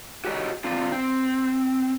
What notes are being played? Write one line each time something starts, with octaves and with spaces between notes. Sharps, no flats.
F#4 G4 C#5 D#5
C4 D4 F4
C4